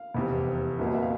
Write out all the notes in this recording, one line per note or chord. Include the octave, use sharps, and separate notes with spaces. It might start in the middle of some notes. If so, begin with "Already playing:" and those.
Already playing: F5
F1 E2 C3
C2 A#2 F#3 B3
D#5
E5
F5